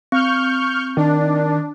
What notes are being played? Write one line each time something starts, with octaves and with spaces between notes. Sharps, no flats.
C4 C#6 F6 G6
D#3 D4